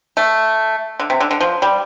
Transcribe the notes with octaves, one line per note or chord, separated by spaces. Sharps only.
A3
D3
C3
D3
D3
F3
G3